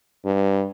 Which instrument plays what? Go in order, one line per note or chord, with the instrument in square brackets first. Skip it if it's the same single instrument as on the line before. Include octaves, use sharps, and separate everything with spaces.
[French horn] G2